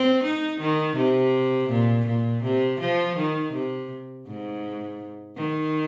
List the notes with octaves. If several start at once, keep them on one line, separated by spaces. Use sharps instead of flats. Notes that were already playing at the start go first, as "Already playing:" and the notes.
Already playing: C4
D#4
D#3
C3
A#2
A#2
C3
F3
D#3
C3
G#2
D#3